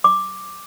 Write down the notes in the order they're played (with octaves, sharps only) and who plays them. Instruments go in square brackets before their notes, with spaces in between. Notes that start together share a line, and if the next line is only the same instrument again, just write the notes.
[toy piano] D6